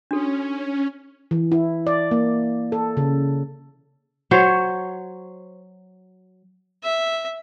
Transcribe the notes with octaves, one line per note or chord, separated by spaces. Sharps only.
C#4 D4 F#4 A4
E3
E4
D5
A#3
A4
C#3
F#3 C5 C#5
E5